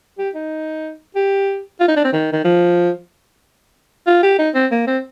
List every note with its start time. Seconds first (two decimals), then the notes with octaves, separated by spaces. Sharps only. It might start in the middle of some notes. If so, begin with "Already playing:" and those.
0.18 G4
0.35 D#4
1.16 G4
1.80 F4
1.88 D#4
1.96 D4
2.04 C4
2.13 D#3
2.33 D#3
2.44 F3
4.07 F4
4.23 G4
4.39 D#4
4.55 C4
4.71 A#3
4.87 C4